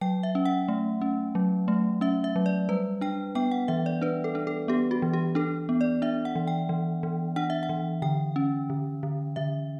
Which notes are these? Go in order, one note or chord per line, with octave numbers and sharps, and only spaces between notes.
F#3 G5
E5
C#4
F#5
A3
C#4
F#3
A3
C#4 E5
E5
F#3
D5
G3 B4
D4 G5
B3 G5
F#5
E3 E5
D5
D4 B4
A4
D4
A4
B3 G4
F#4
E3
G4
D4 A4
B3
D5
D4 E5
F#5
E3
G5
E3
E3
D4 F#5
E5
F#5
E3
D3 G5
C#4
D3
D3
D3 E5